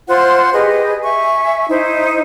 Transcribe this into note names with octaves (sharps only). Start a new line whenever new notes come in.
F4 C5 F#5 C6
G4 G#4 B4 D#5
E5 G#5 C#6
D#4 E4 C5